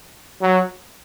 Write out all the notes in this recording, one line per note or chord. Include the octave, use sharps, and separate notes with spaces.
F#3